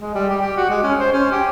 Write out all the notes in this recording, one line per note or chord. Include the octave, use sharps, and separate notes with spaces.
G#3
G3
G4
G4
F#4
G#3
C#4
C5
C#4
G4